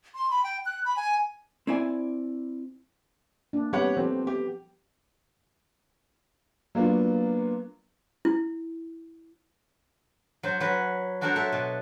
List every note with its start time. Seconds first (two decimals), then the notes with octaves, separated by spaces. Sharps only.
0.15 C6
0.30 B5
0.44 G5
0.66 F#6
0.85 B5
0.96 G#5
1.67 C4 E4 D5 G#5
3.53 A#3 D4
3.73 G3 B3 C4 G4 C#5 F#5
3.97 F3 C4 G4 A4
4.27 B3 G4
6.75 F#3 A#3 B3 D4 F4
8.25 E4
10.43 F#3 C5
10.60 F#3 B4
11.21 D4 F#4 A4 A#4 C5 C#5
11.36 A4 E5
11.52 B2